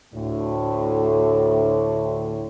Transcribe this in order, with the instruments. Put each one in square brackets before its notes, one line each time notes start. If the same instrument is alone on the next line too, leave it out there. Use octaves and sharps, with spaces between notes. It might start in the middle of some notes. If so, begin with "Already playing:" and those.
[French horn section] D2 A2